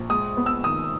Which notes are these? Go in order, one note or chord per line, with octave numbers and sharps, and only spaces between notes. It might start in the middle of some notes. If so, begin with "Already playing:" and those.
Already playing: A#1
G#3 D#6
B3
E6
D#3 D#6